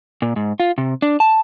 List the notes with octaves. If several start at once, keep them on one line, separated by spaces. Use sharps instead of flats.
A#2
G#2
F4
C3
D4
A5